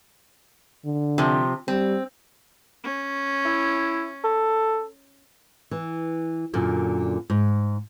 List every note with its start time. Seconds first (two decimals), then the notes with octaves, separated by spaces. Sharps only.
0.85 D3
1.18 C3 F3
1.68 G3 C4
2.85 C#4
3.45 E4
4.24 A4
5.71 E3
6.53 F#2 A#2 D3
7.30 G#2